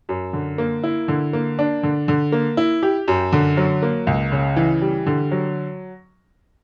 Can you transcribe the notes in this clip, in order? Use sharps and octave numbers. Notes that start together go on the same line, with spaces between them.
F#2
D3
A#3
E4
D3
A#3
D4
D3
D3
A#3
E4
G4
F#2
D3
F#3
A#3
C#2
C#3
E3
G3
D3
F#3